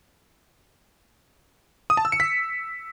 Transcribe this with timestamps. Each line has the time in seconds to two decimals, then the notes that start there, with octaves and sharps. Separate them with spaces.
1.90 D#6
1.97 A5
2.05 E6
2.12 C#7
2.20 B6